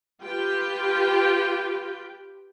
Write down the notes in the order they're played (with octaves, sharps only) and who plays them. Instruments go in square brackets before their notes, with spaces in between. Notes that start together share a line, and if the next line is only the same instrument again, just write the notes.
[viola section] F4 G4 B4 G5